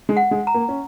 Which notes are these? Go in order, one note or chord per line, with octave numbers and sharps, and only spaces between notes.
G#3
F#5
G#3
A#5
A#3
C#4